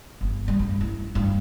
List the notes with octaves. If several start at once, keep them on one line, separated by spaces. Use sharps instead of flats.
G1
G3
G2
E4
G2